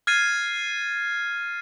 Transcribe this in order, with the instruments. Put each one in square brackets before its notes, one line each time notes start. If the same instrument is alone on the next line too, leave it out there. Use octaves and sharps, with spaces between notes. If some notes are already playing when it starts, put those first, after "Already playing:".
[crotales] F6 G#6 A6 C7 D#7